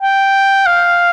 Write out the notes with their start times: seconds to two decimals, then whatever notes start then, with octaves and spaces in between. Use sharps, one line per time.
0.02 G5
0.66 F5